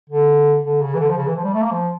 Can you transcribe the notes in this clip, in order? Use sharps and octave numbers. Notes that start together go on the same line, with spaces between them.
D3
D3
C#3
E3
D3
F3
C#3
E3
F3
G3
A3
A#3
F3